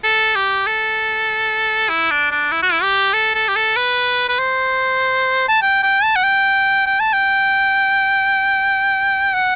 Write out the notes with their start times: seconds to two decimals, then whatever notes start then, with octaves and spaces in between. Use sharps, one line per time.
0.03 A4
0.35 G4
0.66 A4
1.89 E4
2.11 D4
2.31 D4
2.52 E4
2.62 F#4
2.72 E4
2.82 G4
3.13 A4
3.35 A4
3.48 G4
3.56 A4
3.76 B4
4.29 B4
4.38 C5
5.48 A5
5.62 G5
5.83 G5
6.03 A5
6.16 F#5
6.23 G5
6.86 G5
7.00 A5
7.13 G5
9.34 F#5